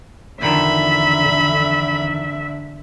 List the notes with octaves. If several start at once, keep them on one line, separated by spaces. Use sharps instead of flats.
E2 D3 D#3 F3 E5 B5